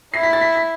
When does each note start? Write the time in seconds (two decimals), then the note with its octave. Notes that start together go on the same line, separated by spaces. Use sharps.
0.14 E4 C7
0.23 B6
0.33 A6
0.42 B6
0.56 B6